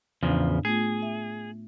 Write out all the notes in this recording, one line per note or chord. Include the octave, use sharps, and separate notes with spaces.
E2 A2 C#3 F3 D4
A3 B3 F4 G#4
E5